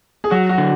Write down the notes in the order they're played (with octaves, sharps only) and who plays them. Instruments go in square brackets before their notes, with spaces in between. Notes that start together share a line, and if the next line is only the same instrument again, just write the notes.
[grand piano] G#4
[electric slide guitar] F#3 [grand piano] F#4
[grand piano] F#4
[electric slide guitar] D3